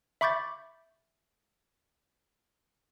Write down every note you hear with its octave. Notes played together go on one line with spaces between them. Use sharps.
E5 B5 C#6 D6 G6 A6